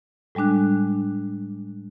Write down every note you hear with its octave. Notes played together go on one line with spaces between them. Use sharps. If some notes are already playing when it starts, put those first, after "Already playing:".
A2 G3 G#3 D4 F#6